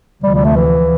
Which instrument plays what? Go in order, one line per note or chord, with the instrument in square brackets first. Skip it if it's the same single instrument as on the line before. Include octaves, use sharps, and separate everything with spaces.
[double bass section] D2 C3 F3 [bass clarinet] G3
[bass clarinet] G3
A3
E3